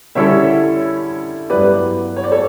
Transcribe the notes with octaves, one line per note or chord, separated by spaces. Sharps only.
D3 G3 C#4 E4 A4 C#5 E5
G2 F#3 B3 E4 G4 B4 D5
C#5
D5
A4 C#5